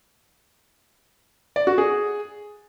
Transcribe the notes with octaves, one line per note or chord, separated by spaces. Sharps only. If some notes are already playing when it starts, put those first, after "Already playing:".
D5
F#4
G#4